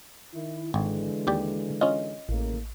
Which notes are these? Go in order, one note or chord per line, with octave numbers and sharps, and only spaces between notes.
D#3 E4
G#1 D3 E3 G#3
D#2 G4 D5
C#4 F4 D#5
A1 A2 C#3 A#3